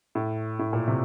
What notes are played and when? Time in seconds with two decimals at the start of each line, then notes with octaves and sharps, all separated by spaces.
0.15 A2
0.59 A2
0.73 A#2
0.88 C3